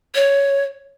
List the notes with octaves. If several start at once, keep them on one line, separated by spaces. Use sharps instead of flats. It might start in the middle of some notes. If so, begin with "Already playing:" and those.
C#5